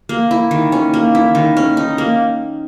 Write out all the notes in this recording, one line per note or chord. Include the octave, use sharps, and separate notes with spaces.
A#3
E4
D#3
C#4
A#3
E4
D#3
C#4
D#4
A#3